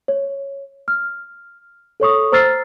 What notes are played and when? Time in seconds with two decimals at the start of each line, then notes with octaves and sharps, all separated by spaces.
0.08 C#5
0.88 F6
2.00 A4 C#5 C#6 D#6
2.32 C5 A#5 E6 F6 A6 C7